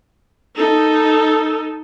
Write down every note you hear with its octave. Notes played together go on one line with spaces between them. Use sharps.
D#4 A4